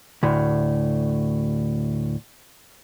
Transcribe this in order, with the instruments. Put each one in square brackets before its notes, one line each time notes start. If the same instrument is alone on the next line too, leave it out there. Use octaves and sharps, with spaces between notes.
[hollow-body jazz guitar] D2 A2